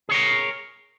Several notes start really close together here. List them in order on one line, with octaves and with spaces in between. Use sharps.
G#4 C#5 A#4